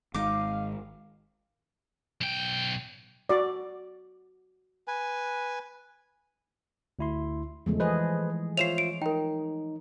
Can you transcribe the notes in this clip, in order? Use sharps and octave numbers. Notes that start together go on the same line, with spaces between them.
G#1 G#3 D#4 F5 D6
B1 G5
F#4 D5
B4 G#5
D2 E4 C6
E2 C#3 F3 G#3 A3
E3 G#4 B4 C5 D#5
F4 C5 C#5 E5 C7 E7 F7
D7
D#4 A#4 G5